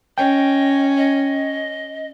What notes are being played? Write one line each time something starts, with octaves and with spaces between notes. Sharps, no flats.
C#4 D#5 G5
D#5